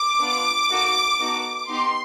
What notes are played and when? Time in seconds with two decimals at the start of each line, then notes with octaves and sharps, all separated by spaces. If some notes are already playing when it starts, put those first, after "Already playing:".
Already playing: D6
0.20 B3 D4 F4
0.70 A#3 D#4 F#4 A4
1.20 B3 D#4 F#4 A4
1.69 B3 D#4 G4 C6